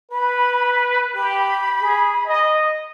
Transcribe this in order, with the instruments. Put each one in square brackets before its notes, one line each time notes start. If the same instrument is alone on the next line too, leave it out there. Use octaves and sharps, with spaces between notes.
[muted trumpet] B4 [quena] B5
[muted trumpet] G4 [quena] B5
[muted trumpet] G#4
D#5